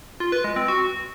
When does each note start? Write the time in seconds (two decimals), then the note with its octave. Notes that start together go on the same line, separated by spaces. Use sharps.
0.20 F4
0.32 B4
0.44 G#3
0.56 C4
0.68 F#4